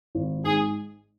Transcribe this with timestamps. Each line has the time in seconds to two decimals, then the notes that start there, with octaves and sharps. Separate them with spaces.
0.15 G#1
0.45 G#2 G#4